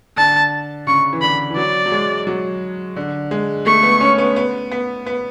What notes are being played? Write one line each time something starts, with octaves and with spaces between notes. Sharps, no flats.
D3 A5
C#3 C#6
E3
D3 B5
E3
F#3 D5
F#3
G#3
F#3
D3
G#3
A3 C#6
B3
C#4
B3
B3
B3
B3